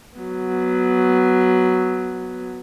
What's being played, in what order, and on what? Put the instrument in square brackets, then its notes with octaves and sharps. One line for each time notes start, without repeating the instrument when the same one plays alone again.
[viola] F#3 B3